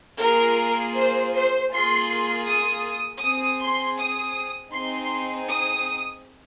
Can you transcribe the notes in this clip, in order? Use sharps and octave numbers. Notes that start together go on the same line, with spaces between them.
A#3 F4 G#4 A#4
C5
C5
A#3 F4 G#4 C6
D#6
C4 G#4 D#6
C6
D#6
C4 D#4 G#4 C6
D#6